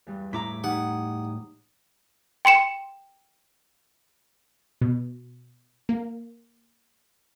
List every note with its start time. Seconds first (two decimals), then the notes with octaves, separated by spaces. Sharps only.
0.07 E2 G2
0.33 A2 E4 A#5 D6 B6
0.64 D#4 G4 F#5 D#6
2.45 G5 C6 C#7 E7
4.81 B2
5.89 A#3